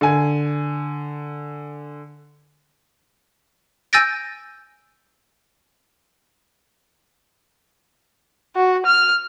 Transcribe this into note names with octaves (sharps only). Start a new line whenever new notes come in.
D3 G#5
G#5 E6 G6 A6 A#6 D7
F#4
F6